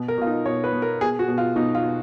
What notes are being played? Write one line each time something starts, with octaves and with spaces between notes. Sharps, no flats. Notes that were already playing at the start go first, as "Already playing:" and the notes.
Already playing: B2
A#4
B2 F4
D#4
B2 C#5
B4
B2
A#4
B2 G#4
F#4
B2
F4
B2 D#4
F4
B2